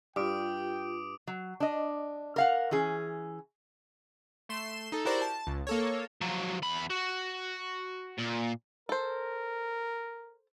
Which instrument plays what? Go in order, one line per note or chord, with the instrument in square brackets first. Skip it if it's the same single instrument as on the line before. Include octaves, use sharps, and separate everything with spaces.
[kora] G2 [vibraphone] F4 G4 [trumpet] G5 [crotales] D6 D#6 D7
[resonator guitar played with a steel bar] F#3
D4 D#5
A#4 F5 F#5
E3 C#4 G#4
[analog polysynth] A3 C6 E7
D#4 A4
E4 F#4 G4 A#4 C5 D5
A5
C#2
A#3 A4 C#5
[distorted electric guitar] F3 F#3
E2 B5
F#4
A#2
[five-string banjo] A4 C5 [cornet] A#4